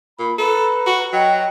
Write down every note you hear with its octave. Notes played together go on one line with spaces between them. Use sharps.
A#2 B5
A4 B4 A#5 B5
F#4
F#3 D#5 G5